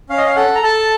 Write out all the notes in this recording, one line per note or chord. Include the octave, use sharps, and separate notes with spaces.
C#4 F5
D#5
F5
A4 F#5
A#5
A4 A5